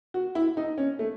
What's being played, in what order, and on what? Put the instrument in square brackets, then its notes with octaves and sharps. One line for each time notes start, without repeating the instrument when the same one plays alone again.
[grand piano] F#4
E4
D#4
C#4
A3